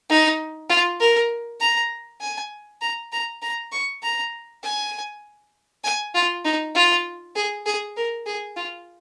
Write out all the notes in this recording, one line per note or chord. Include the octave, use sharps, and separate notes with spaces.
D#4
F4
A#4
A#5
G#5
A#5
A#5
A#5
C#6
A#5
G#5
G#5
F4
D#4
F4
G#4
G#4
A#4
G#4
F4